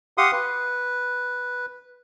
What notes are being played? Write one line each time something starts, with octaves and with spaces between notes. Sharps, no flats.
G4 F5 F#5 C6 D#6
B4